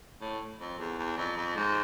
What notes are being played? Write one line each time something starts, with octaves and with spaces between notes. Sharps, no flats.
A2
F2
E2
E2
F2
F2
G#2